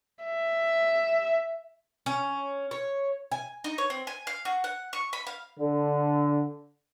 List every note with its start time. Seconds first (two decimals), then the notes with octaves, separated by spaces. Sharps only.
0.24 E5
2.06 C#4
2.71 C#5
3.32 G#5
3.64 D#4
3.78 C#5
3.90 C4
4.07 G#5
4.27 F5
4.45 F#4
4.64 F#5
4.93 C#6
5.13 B5
5.27 F5
5.59 D3